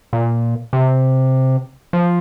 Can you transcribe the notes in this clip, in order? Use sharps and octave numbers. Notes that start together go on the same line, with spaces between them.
A#2
C3
F3